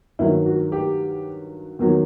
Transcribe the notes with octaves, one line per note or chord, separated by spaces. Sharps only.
G2 D#3 F#3 E4
F#4
G4
E2 D#3 F#3